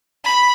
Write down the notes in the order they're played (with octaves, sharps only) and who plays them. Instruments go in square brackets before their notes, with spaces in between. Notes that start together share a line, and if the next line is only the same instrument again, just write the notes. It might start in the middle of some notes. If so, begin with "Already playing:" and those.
[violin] B5